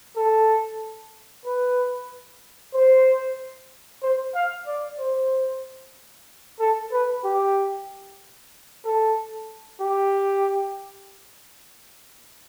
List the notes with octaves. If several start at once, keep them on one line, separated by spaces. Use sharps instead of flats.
A4
B4
C5
C5
F5
D5
C5
A4
B4
G4
A4
G4